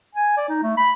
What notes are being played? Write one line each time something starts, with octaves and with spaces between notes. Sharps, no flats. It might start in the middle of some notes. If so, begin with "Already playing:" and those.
G#5
D5
D#4
A3
B5